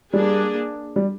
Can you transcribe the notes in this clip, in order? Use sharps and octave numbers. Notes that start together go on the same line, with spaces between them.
G3 A#3 D4 G#4
G3